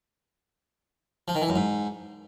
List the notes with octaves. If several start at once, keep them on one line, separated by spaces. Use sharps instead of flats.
F3
D#3
E3
F#2
G#2